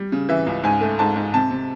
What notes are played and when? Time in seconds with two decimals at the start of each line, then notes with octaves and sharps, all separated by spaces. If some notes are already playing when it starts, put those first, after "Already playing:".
Already playing: G3
0.12 C#3
0.29 E3 E5
0.47 C#2
0.64 G#2 G#5
0.81 A3
0.99 G#2 A5
1.16 G#2
1.34 C3 A5
1.51 C3